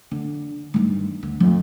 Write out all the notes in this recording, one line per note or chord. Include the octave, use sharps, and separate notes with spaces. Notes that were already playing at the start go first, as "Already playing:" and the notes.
D3
G2 D#3
D2
F2